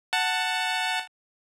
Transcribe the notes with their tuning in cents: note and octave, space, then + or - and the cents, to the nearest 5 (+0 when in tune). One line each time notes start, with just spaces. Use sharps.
F#5 +0 A5 +10